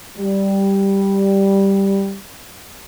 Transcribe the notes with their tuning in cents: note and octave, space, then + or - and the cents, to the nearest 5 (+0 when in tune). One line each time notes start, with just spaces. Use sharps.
G3 +0